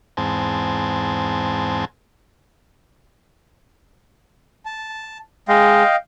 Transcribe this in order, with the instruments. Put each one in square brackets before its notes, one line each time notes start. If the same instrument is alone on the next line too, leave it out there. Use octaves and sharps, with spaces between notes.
[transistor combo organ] E2 G#2 C4 G#5 A5
[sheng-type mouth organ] A5
[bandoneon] G#3 [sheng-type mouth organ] D#5 F5 G5